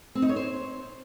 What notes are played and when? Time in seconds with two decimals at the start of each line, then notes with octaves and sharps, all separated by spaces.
0.15 C4
0.22 D#4
0.29 C#5
0.36 C5